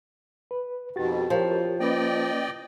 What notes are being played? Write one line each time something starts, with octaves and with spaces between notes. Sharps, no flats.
B4
F2 B2 D#3 F#4 G4 A6
F2 F3 G4 A#4 C#5
A#3 C#4 B4 D5 D#5 G5